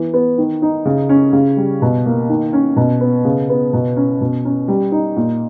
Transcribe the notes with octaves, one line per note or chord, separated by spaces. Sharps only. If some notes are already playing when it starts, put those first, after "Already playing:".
Already playing: E3 B3
B3
D#3
D#4
C#3
C#4
C#3
G3
B2
A#3
D#3
C#4
B2
B3
C#3
B3
B2
C#4
B2
C#4
G3
D#4
A#2